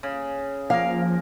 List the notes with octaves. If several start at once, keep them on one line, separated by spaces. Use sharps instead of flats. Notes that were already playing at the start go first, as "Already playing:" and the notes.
C#3
F3 A#3 A#4 F5